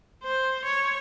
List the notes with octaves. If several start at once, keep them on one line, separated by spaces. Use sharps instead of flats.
C5
C#5